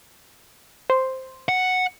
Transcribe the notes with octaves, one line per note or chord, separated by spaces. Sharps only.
C5
F#5